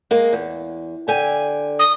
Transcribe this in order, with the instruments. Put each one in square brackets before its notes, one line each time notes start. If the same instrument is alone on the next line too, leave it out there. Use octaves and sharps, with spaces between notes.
[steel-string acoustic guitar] G#3 A#3
E2
D3 G4 G#5
[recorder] D#6